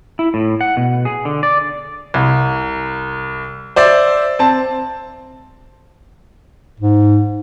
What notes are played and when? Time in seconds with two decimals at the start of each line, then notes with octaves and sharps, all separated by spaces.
0.19 E4
0.34 A2
0.61 F#5
0.77 B2
1.05 G#4
1.25 D3
1.43 D5
2.14 C2
3.76 C5 D5 E5
4.39 C4 A5
6.80 G#2